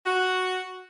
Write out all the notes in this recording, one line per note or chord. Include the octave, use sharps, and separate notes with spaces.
F#4